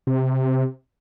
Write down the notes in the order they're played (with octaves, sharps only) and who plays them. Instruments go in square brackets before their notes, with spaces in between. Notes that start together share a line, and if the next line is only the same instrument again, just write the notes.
[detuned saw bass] C3